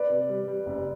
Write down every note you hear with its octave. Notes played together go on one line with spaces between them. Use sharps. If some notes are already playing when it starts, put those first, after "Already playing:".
Already playing: B4 D5
C3
G3
G3
F#1